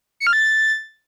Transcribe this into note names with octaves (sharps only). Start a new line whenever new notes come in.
C#7
F6
A6